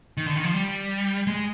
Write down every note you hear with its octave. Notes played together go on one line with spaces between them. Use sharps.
D#3
D3
D#3
F3
G3
G#3